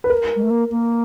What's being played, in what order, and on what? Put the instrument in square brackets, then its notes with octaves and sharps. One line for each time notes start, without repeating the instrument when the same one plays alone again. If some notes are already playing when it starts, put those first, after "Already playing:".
[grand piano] B4
A#4
[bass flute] G#3
A3
A#3
A#3